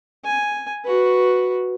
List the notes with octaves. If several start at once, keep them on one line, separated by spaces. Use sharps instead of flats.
G#5
F#4 B4